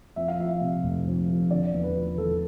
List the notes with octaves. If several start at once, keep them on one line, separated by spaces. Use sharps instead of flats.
F2 E5
F5
F3 E5
C3
F1
F2
F3
D3 D5
E2
B4
F3
E2 A4